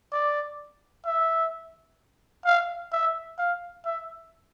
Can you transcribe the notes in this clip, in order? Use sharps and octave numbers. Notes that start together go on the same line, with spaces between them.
D5
E5
F5
E5
F5
E5